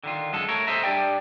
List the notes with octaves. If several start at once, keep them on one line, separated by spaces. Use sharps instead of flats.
D3 D#3 F4
F#2 G#3 A4
A3 A#4 C#5
A4 B4 C5 D#5 E5 A#5
D4 G4 D5 G5